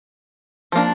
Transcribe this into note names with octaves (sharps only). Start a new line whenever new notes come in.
F3 A#3 D4